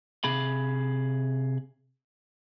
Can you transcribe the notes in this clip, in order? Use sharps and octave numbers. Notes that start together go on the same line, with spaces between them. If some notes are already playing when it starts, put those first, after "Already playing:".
C3 G#4 B5